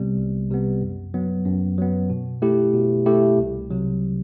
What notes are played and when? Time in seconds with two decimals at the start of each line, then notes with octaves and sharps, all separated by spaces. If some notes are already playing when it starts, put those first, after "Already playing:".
Already playing: C2 C3 G3 B3
0.18 C2
0.50 C3 G3 B3
0.82 F#2
1.14 F#3 B3
1.46 F#2
1.78 F#3 B3
2.10 B2
2.42 A3 E4 G4
2.74 B2
3.06 A3 E4 G4
3.38 C2
3.71 C3 F#3